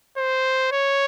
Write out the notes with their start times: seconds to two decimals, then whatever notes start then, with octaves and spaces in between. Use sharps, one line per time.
0.18 C5
0.72 C#5